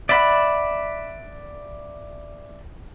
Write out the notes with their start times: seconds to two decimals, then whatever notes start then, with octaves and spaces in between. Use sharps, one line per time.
0.09 D5 E5 F#5 B5